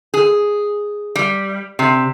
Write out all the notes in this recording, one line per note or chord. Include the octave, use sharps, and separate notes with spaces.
G#4
G3
C3